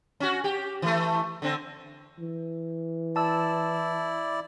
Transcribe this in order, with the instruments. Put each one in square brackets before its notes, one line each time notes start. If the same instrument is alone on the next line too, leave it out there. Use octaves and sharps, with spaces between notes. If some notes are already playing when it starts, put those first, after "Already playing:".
[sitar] C#4 F#4
G4
E3 A3
D3 C4
[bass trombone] E3
[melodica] E4 D5 [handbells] A5 E6